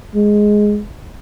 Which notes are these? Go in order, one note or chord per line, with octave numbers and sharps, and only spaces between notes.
G#3